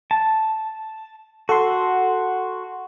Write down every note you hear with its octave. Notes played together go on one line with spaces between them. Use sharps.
A5
F#4 A4 F#5 C6